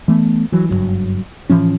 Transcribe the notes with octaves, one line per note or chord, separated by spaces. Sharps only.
E3 A3 B3
E3 F#3
F#1 C2 G2 F#3
A2 E3 F3 C#4